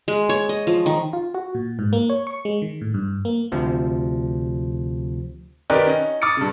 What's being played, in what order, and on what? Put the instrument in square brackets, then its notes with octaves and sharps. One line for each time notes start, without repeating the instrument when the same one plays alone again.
[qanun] G#3
C#5
D#5
F3
D#3
[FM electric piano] F4
F#4
A#2
G#2
A#3
C#5
C#6
G#3
D#3
A2
G2
A#3
[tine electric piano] D2 C3 F3
[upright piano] D#3 D#4 G4 A#4 B4 D5
C#4 D#4
D6 D#6 F6 A6 C#7
G2 C#3